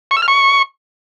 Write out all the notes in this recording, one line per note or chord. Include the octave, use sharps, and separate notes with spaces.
C#6
E6
F6
C#6